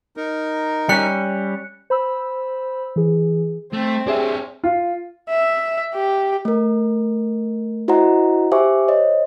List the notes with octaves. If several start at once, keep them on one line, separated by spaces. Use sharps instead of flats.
D#4 A#4
G3 C#4 F#6 C#7
C5 B5 E6
E3 G#4
A3 C4
D4 G4 G#4 C#5 E5
F4
E5
G4
A3 A#4
E4 F#4 C5 D#5 F#5 A#5
G4 C5 E5 G#5 C#6 D6
C5 C#5 D#5